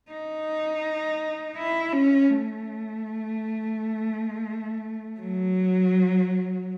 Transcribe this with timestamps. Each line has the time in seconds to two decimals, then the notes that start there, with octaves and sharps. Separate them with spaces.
0.11 D#4
1.57 E4
1.93 C#4
2.29 A3
5.20 F#3